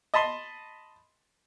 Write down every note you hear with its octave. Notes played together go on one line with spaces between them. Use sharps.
D#5 A5 B5 C6